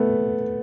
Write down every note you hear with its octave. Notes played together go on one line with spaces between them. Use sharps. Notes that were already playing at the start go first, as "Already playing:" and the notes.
Already playing: A3 B3